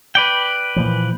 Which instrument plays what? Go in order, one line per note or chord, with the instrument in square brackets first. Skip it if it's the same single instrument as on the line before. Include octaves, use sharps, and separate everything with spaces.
[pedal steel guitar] B4 D5 G5
[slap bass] A#2 E3 F3